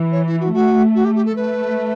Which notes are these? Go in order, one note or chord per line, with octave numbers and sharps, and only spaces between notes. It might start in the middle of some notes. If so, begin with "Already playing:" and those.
Already playing: E3
C#5
E4
F#4
A3 F#4
F#4
G4
G4
A4
A3 B4